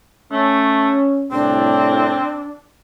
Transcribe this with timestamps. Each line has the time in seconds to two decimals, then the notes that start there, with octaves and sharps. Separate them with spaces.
0.32 A3 C#4
1.32 C2 A2 C4 D4